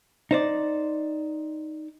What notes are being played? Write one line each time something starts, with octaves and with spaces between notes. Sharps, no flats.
D#4 C5 D5